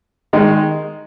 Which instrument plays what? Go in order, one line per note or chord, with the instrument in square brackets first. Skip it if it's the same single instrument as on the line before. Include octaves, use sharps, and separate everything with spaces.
[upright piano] D#3 G#3 D#4